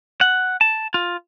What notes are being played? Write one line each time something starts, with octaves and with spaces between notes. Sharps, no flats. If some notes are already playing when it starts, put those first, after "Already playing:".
F#5
A5
F4